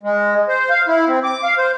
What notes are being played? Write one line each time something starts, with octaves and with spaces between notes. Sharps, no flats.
G#3
C5
F5
E4
C4
D6
F5
C5